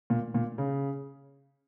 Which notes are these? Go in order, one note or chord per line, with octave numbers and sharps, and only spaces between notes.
A#2
A#2
C#3